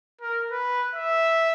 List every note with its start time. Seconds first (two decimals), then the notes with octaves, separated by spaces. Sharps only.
0.21 A#4
0.51 B4
0.95 E5